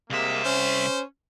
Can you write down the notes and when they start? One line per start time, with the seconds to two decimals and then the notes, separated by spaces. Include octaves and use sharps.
0.10 C2 C3 G#3 A#3 E5
0.44 C#4 C5